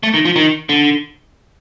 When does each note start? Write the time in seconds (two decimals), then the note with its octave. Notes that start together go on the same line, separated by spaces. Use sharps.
0.03 A3
0.14 D#3
0.25 F3
0.36 D#3
0.69 D3